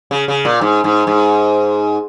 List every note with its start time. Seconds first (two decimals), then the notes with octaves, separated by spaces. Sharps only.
0.11 C#3
0.28 C#3
0.45 A#2
0.61 G#2
0.84 G#2
1.07 G#2